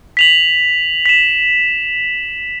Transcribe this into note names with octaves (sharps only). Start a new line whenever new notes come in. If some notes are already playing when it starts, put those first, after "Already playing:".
B6 F7 F#7
B6 E7